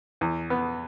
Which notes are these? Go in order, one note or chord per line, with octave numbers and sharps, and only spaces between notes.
E2
B3